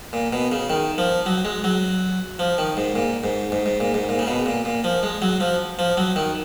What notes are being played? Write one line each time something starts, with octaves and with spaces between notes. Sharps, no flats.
A#2
B2
C#3
D#3
F3
F#3
G#3
F#3
F3
D#3
G#2
A#2
G#2
G#2
G#2
A#2
G#2
A#2
C#3
B2
A#2
A#2
F3
G#3
F#3
F3
F3
F#3
D#3